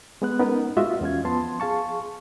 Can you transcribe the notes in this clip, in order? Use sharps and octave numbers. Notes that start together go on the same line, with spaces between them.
G#3 B3 F#6
B3 C#4 D#4 A#4 B4
G#3 F4 F#4 D#5 E5
E2 C#4 F4 G#6
F3 B3 A5 C6
G#4 F5 A5 C#6